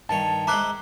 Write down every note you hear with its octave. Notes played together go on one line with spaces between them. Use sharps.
G2 D#3 C#5 A5
G#3 C5 E5 A#5 D6 F#6